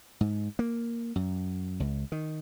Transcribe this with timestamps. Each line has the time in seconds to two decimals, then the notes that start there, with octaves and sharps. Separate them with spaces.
0.21 G#2
0.59 A#3
1.16 F#2
1.80 C#2
2.12 D#3